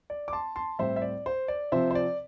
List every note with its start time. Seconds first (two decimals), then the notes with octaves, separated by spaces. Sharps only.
0.10 D5
0.28 D6
0.33 A5 C6
0.56 A5 C6
0.79 A2 G3 C4 C5 E5
0.96 E5
1.02 D5
1.26 C5
1.48 D5
1.72 C3 F3 C4 C5 E5
1.91 C5
1.95 D5